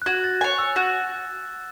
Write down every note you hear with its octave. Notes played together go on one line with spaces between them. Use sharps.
F#6
F#4 G#6
A6
C#5 G#5 G#6
E6
F#4